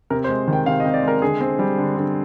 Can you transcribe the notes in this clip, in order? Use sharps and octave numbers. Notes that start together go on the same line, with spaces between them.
C3 A#4
C5
G#3
D#3
G5
C3 F5
D#5
C3
D5
G#3 A#4
D3 G#4
C4
G3
D3
D3